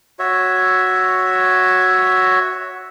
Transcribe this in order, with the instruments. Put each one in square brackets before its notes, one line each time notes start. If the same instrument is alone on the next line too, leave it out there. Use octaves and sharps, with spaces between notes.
[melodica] F#4 C#5 E5